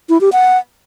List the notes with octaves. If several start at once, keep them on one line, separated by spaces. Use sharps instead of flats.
E4
G4
F#5